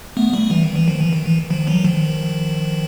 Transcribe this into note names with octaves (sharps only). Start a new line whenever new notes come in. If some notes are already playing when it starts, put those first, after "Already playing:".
A3 B3
G3 A3
E3
D#3
E3
D#3 F3
E3
D#3
E3
D#3 F3
E3 F#3
D#3 F3